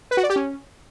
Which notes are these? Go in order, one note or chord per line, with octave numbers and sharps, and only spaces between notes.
B4
F#4
D5
G4
C#4